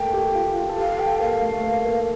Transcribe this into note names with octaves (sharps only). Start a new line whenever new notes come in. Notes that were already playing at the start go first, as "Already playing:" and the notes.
Already playing: A3 A#3 A4 G5
G4
F4
F4
A4
G4 F5
A4 G5
A#3 F5
A3
A#3
A#3